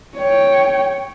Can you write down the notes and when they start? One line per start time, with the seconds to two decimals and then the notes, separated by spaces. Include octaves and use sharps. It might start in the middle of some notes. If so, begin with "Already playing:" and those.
0.17 C#5 G5